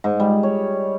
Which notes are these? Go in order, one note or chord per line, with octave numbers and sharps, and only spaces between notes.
G#2
G3
C#5